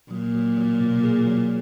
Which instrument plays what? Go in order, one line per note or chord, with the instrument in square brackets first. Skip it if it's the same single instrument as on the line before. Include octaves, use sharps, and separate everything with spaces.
[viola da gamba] A#2 [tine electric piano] F#3
[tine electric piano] F#3
F#3
B2
G#4
F#3